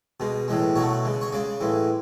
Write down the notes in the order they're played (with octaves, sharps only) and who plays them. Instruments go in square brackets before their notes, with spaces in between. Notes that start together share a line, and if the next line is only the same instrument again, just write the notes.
[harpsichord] B2 G#3
A2 E3 G#3
B2 F#3 A3 C#5
C#3 G#3
C#5
C#3 G#3 D5
A2 E3 G#3